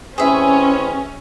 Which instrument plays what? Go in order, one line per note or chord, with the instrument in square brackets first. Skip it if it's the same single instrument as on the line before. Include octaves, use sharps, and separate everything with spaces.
[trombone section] A1 C4 B4 [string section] C#4 [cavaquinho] G#4 E5